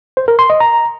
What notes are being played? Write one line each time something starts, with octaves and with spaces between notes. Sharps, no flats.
C5
A#4
C6
D#5
A#5